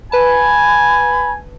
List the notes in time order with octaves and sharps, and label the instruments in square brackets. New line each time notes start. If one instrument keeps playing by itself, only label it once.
[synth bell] B4 A5 [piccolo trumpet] G#5 [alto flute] B5